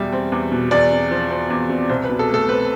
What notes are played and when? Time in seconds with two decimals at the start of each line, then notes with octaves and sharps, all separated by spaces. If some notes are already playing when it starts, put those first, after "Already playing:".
Already playing: E2 B2 G3 E5
0.12 C4
0.32 E2
0.52 B2
0.71 E2 D5
0.91 C3
1.11 F3
1.30 C4
1.50 E2
1.69 C3
1.89 C2 C5
2.04 B4
2.09 B2
2.19 A4
2.30 A3 A4
2.49 C4 B4